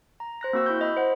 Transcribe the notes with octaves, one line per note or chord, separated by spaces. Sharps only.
A#5
C5 F#6 A#6
A#3 C4 F#4 C#6 E6
E4 B5 G6
D#5 B5
C5 F#5